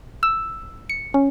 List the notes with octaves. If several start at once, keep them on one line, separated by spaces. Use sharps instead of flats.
E6
C#7
C#4